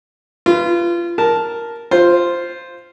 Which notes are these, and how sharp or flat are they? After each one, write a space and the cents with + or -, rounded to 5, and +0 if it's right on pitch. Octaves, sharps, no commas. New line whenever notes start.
F4 -25 B4 +0
A#4 +0 A5 -5
F4 -5 C5 +0